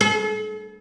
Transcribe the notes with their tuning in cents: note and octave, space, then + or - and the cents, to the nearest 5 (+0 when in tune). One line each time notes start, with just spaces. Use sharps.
A4 -45